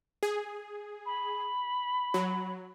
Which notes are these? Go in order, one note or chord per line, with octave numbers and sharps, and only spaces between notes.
G#4
B5
F#3